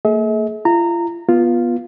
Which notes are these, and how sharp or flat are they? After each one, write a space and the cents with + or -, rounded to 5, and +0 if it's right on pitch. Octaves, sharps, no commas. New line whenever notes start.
A#3 -40 G#4 +35 E5 -45
F4 -35 A#5 -20
B3 -20 F4 +0